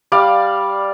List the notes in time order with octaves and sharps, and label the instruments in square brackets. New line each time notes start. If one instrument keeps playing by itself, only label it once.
[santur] G3 D5 F5